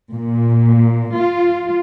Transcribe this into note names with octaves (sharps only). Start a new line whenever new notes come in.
A#2
F4